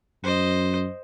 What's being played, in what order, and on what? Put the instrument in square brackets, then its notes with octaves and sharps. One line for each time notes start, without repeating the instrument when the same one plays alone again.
[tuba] F#2 [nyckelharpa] C5 D#5